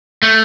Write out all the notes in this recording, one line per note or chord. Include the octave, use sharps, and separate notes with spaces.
A3